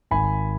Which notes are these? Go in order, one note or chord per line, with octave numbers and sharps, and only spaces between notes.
G#1 G#5 B5